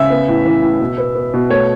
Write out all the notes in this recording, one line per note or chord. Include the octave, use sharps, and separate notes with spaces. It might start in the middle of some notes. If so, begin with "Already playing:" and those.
Already playing: C#3 E5
B3
A2
E3
A2
B2
B3
B3
B2
A3 C#5